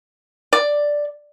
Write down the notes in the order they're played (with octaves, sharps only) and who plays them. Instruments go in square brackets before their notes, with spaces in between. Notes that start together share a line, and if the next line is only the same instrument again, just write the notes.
[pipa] D5